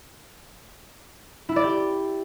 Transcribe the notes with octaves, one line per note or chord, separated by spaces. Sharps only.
E4
D5
G4